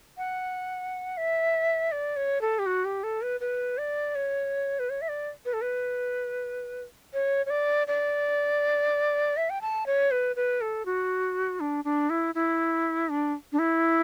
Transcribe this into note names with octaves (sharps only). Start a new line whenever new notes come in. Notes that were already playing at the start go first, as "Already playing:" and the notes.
F#5
E5
D5
C#5
A4
G4
F#4
G4
A4
B4
B4
D5
C#5
B4
C#5
E5
D5
B4
A4
B4
C#5
C#5
D5
D5
E5
G5
A5
C#5
B4
B4
A4
F#4
D4
D4
E4
E4
D4
D4
E4